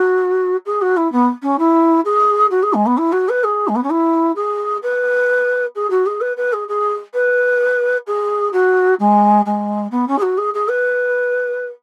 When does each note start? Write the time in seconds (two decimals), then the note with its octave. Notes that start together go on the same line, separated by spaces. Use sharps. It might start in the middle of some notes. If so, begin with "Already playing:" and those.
Already playing: F#4
0.66 G#4
0.82 F#4
0.97 E4
1.12 B3
1.43 C#4
1.59 E4
2.05 G#4
2.51 F#4
2.63 G#4
2.74 G#3
2.86 B3
2.98 E4
3.12 F#4
3.29 B4
3.44 G#4
3.68 G#3
3.75 B3
3.83 C#4
3.90 E4
4.36 G#4
4.83 B4
5.76 G#4
5.90 F#4
6.06 G#4
6.21 B4
6.37 B4
6.53 G#4
6.68 G#4
7.14 B4
8.07 G#4
8.53 F#4
8.99 G#3
9.46 G#3
9.91 B3
10.08 C#4
10.18 G#4
10.22 F#4
10.38 G#4
10.54 G#4
10.68 B4